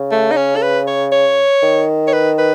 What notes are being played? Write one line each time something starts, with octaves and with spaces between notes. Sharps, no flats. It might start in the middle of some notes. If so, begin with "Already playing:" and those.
Already playing: C#3
A3
D#4
C#4
A4
B4
C#5
C#5
D#3
C#5
B4
B4